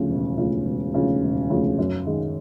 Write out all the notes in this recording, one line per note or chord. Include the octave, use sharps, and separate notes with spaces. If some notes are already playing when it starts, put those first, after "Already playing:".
Already playing: D2 C#3 F3
E1
D2 C#3 F3
E1
D2 C#3 F3
E1
D2 C#3 F3
F#2
D#3 G#3